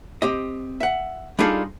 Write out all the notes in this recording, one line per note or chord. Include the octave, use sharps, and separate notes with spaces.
C4 G4 D#5
E5 F#5
G3 D4 D#4 F4 G#4 A4